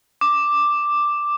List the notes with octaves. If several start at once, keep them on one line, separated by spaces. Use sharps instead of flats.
D6